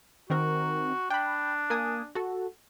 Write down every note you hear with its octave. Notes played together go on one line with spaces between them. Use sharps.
D#3 C4 F#4 A#4
D4 G5 B5
A#3 G#5 D#6
F#4 A4